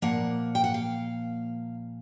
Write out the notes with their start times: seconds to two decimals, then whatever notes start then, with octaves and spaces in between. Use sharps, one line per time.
0.02 A#2 F3 A#3 F#5
0.55 G5
0.64 F#5
0.74 F5